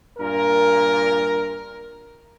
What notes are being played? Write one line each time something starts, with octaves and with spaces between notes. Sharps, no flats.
G2 A#2 A#4